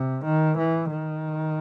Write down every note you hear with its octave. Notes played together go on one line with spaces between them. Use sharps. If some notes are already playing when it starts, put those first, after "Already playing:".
Already playing: C3
D#3
E3
D#3